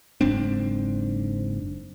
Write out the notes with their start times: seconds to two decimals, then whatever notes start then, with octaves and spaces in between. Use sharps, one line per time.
0.21 F#1 G#2 C4 D4